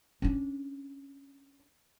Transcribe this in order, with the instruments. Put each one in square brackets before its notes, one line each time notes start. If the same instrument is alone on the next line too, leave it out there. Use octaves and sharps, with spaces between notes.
[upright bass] C#4 D4